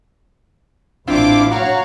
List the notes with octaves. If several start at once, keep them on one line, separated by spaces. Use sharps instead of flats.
A1 C4 D4 E4 F4 D6
F#4 C#5 F5 A#5